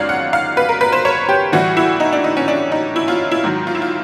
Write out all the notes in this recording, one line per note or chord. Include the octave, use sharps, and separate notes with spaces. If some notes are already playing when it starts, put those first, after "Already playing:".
Already playing: F#2 D#3 G#3 C#5 D5 F5
F#5
F5
B4
A#4
B4
C5
C#5
G4
A2 E3 G3 F#4
E4
D#4
D4
D#4
C#4
D4
D#4
E4
F4
E4
G#2 D#3 F#3
F4
E4
F4